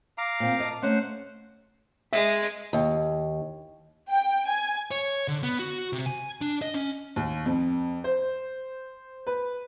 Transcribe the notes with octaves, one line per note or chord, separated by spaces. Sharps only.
F5 A#5 D6
A#2 C4
D#5 A5
A3 C#4 C5 F#5
G#3 E5
D#2
G5
G#5
C#5
D3
B3
F#4
C3
G#5
D4
D#5
C#4
D#2
F2
C5
B4